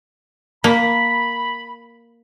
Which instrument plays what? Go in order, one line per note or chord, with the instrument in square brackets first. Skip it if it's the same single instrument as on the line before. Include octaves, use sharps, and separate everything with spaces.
[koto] A#3 [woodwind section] B5